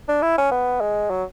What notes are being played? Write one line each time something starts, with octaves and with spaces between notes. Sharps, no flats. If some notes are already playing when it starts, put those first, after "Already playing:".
D4
E4
C#4
B3
G#3
F#3